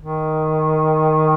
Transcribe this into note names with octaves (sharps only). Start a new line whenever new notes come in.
D#3